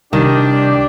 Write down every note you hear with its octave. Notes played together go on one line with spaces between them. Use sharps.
C2 D#3 D4 G4